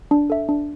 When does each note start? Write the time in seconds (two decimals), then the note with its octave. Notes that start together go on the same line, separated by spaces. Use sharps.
0.11 D4
0.30 A4 E5
0.49 D4